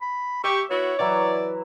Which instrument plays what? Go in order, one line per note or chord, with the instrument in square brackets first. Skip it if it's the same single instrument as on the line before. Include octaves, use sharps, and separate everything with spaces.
[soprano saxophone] B5
[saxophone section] G4 [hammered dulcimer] E5 [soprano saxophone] C#6
[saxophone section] B3 E4 F#4 [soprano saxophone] C#5
[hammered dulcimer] E3 F#3 E4 [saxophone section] D5